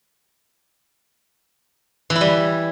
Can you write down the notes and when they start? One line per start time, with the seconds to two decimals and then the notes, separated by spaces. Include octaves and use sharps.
2.10 E3
2.15 E4
2.21 G3